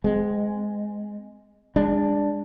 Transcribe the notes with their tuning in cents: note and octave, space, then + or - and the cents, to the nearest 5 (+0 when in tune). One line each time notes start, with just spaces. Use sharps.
G#3 +0 C4 -35
G#3 -35 D4 +0